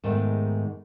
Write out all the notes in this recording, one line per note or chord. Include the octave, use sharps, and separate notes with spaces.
G#2 D#3 G#3 A3 B3